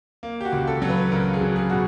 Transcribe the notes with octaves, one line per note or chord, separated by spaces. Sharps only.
A#3
G4
F#4
C#2
A4
F#3
B4
C#2 A#4
G#4
F#3
G#4
B2 F#4